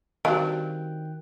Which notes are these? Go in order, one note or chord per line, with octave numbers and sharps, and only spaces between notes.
D#3 G3 C4 D4 F#4 F5 G5 F#6